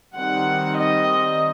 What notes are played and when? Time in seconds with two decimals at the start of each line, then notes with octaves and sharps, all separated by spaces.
0.16 D#3 G3 C4 D#4 F#5
0.78 D#5